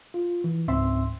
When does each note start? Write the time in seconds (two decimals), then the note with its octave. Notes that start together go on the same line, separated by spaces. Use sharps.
0.14 F4
0.44 E3
0.68 C#2 G#2 C4 E5 C6